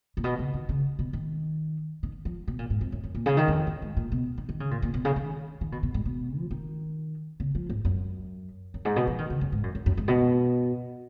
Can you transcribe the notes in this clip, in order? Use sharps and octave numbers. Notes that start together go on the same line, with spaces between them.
A#2
B2
C#3
D#3
C#3
B2
D#3
D#3
F3
B2
A#2
G#2
F2
F#2
F#2
A#2
C#3
D#3
F#2
F2
F#2
G#2
A#2
B2
D#3
D#3
C#3
A#2
A#2
B2
C#3
D#3
D#3
B2
B2
G#2
B2
F3
D#3
C#3
F3
G#2
F#2
F#2
G#2
B2
F3
D#3
C#3
F#2
G#2
F#2
F#2
F#2
G#2
B2